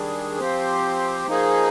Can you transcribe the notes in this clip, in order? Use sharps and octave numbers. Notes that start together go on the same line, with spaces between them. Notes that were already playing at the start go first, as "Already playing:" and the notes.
Already playing: D#3 G3 D4 G#4
F3 C4 G4 C5
F3 A#3 D#4 G#4